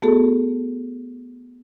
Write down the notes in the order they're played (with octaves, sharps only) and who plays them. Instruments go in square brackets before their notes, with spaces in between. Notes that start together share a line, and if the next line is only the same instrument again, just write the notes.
[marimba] A3 B3 F#4 G#4 A4